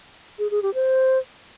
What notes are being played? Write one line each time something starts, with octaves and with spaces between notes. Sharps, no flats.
G#4
G#4
G4
C5